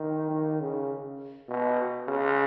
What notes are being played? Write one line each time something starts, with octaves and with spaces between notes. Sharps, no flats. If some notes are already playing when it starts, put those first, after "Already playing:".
Already playing: D#3
D#3
C#3
B2
C#3